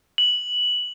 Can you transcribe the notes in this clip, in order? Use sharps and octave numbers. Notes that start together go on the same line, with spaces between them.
F#7